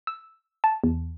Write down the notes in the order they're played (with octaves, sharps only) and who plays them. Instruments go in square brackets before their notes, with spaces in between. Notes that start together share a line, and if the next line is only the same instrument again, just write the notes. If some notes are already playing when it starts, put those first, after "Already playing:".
[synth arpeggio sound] E6
A5
E2